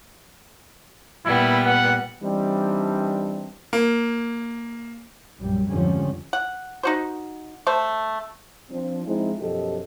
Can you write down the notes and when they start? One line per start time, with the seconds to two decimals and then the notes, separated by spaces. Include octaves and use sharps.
1.25 A#2 G3 B3 E4
1.66 F#5
2.23 E3 G3 C4 D4 D#4
3.73 A#3
5.40 A#1 F#2 G3
5.71 F2 G#2 D3 F3 G3 C#4
6.33 F#5
6.83 D#4 F#4 C5
7.67 A3 C5
8.70 F3 C4 D4
9.06 F3 G#3 C4 D#4 E4
9.41 F#2 B2 F3 G4 A4 D#5